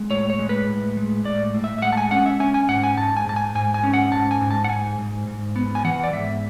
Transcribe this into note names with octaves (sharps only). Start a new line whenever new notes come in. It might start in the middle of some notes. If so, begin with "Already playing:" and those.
Already playing: G#3
A2 C#5
C#5
G#3
B4
A2
G#3
A2 D5
A2
E5
E5
G#3 F#5
A5
G#5
C#4 F#5
E5
C#4 G#5
G#5
G#2 F#5
G#5
G#2 A5
G#5
G#2 A5
G#5
G#2 G#5
G#5
C#4
F#5
G#2 A5
G#5
G#2
A5
F#5
G#2 G#5
G#2
G#2
B3
G#5
E3 F#5
D5
G#2 E5